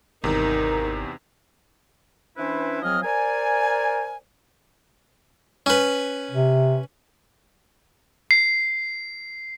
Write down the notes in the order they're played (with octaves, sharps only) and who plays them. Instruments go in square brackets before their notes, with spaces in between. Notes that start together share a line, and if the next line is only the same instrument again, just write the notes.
[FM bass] G#1 [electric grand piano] E2 C3 [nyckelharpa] D#4 [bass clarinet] A#4
[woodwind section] E3 C#4 D4 E4 B4 C5
F3 F#3 C4 G#4 D#5 F6
A#4 C5 D5 G#5
[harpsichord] C#4 B4
[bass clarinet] C3
[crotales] C7